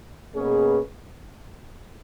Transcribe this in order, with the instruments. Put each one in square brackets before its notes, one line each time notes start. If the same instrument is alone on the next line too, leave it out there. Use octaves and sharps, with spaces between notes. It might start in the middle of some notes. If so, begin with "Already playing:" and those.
[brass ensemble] B2 A#3 C#4 G#4 B4